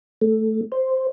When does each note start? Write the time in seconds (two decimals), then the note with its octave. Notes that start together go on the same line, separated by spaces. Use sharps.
0.22 A3
0.72 C5